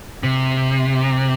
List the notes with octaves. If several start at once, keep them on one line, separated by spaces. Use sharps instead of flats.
C3